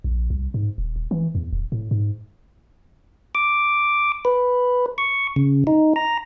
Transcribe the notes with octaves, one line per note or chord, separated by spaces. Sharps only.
A#1
C2
G#2
D#1
D#1
E3
E2
D#1
A2
G#2
D6
B4
C#6
C#3
D#4
A#5